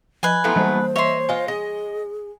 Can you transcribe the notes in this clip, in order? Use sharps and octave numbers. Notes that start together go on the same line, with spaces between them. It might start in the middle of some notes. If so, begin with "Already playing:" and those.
F3 B4 D#5 G#5
F#3 A3 B3 E4 A4 C6
E3 G3 A#3 C5
C#5 D#5 E5 C6
F4 D#5 G#5
G#4 D#5